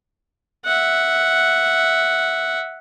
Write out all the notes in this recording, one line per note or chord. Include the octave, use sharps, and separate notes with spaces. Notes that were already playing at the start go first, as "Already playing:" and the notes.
E5 F#5